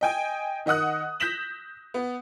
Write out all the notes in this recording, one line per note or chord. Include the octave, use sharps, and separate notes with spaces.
D#5 G5 G#5
D#3 D#5 F#5 D#6 F#6
G6 A#6 B6 E7 F#7
B3